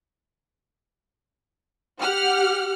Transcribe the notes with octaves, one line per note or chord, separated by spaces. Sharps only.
G4 F#5 F6